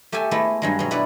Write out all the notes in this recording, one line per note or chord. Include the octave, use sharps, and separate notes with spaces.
A3 G4 A4 E5 G#5
G#3 A3 B3 E4
G2 F#3 G#3
B2 F#3
E4 B4 C#5 D5